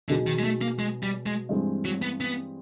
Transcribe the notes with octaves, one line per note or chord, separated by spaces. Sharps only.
B2 D3 F#3 B3 D#4 G#4
D#3
G#3
A3
A#3
G#3
G3
G#3
G2 E3 G#3 C4
F#3
B3
B3